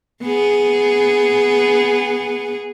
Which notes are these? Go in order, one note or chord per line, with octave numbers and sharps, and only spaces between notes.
B3 G#4